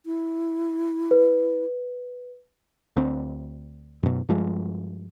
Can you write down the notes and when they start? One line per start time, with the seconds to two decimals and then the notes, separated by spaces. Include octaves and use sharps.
0.06 E4
1.11 B4
2.96 D2 C4
4.03 F#2 B2
4.29 G2 F3 G#3